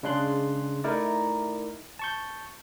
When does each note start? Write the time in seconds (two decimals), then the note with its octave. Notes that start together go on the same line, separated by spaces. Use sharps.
0.03 C#3 G#3 D4 C6 F#6
0.84 A3 D#4 E4 A#4 D5
1.99 A5 C#6 G6